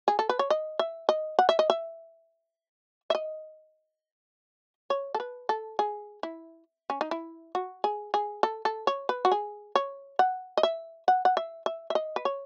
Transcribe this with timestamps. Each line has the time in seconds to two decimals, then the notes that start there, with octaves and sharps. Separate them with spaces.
0.08 G#4
0.19 A4
0.29 B4
0.39 C#5
0.50 D#5
0.79 E5
1.09 D#5
1.39 F#5
1.49 E5
1.59 D#5
1.70 E5
3.10 E5
3.15 D#5
4.90 C#5
5.14 A4
5.20 B4
5.49 A4
5.79 G#4
6.23 E4
6.90 C#4
7.01 D#4
7.11 E4
7.55 F#4
7.84 G#4
8.14 G#4
8.43 A4
8.65 A4
8.87 C#5
9.09 B4
9.25 F#4
9.32 G#4
9.75 C#5
10.19 F#5
10.57 D#5
10.63 E5
11.08 F#5
11.25 F#5
11.37 E5
11.66 E5
11.90 E5
11.95 D#5
12.16 B4
12.25 C#5